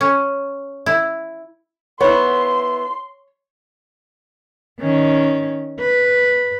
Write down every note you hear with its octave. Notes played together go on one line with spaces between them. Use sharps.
C#4
E4
B3 E4 C#5 C6
D#3 C#4
B4